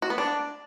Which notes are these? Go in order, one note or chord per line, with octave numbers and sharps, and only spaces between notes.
F#4
B3
D4